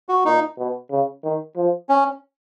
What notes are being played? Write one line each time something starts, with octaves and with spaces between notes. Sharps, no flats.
F#4
A#2 D#4
B2
C#3
D#3
F3
C#4